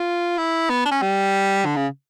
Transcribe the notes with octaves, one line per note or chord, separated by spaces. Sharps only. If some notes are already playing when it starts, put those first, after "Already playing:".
Already playing: F4
E4
B3
D4
C#4
G3
D3
C#3